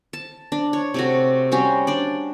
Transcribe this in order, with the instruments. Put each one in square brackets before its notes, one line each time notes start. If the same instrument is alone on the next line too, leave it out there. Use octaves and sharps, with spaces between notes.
[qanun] A5
D4
C#5
C3 A3 F#4
G3 C#4 F#4 C5
D4 D5